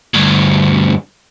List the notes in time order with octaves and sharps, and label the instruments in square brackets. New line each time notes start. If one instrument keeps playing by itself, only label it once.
[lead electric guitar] D2 G2